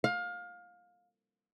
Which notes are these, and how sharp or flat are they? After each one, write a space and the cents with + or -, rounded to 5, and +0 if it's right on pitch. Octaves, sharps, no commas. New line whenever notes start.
F5 +25